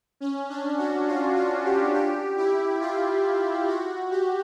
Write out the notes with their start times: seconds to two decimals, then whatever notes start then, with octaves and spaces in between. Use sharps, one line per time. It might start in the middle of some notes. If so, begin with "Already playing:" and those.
0.20 C#4
0.49 D4
0.78 F#4
1.07 F4
1.36 F4
1.65 G4
1.94 G4
2.37 E4
2.80 F4
3.67 F#4
4.11 G4